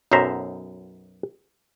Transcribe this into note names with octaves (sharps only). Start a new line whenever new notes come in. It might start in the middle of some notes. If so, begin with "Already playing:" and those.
B1 F#2 B2 C5 E5 A#5